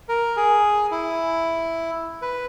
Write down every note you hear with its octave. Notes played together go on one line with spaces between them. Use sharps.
A#4
G#4
E4
B4